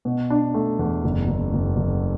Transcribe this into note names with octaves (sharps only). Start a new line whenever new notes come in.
B2
D4
A3
E2
F#1
F#1
F#1
F#1